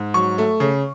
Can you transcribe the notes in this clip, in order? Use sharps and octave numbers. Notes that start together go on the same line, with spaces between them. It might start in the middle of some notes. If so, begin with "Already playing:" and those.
Already playing: G#2
F#3 C#6
A3
C#3